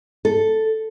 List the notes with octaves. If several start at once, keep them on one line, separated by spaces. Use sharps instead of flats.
A4